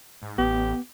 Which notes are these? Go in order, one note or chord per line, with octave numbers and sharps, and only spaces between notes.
G#2
A1 B3 G4